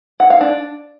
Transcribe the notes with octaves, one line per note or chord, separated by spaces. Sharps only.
F#5
F5
D4